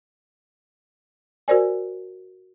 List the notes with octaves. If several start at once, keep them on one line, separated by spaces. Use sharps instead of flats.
F#4 A#4 C5 D5 G#5